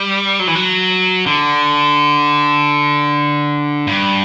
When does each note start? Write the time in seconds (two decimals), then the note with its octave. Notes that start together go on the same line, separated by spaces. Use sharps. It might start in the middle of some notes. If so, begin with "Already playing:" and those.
Already playing: G3
0.40 F#3
0.47 E3
0.55 F#3
1.26 D3
3.87 G2